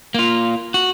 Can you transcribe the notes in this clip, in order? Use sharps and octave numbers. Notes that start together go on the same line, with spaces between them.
A#3 F4
F#4